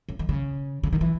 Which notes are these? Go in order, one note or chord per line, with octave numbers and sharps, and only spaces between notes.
C#3
D#3
C#3
C#3
D#3
E3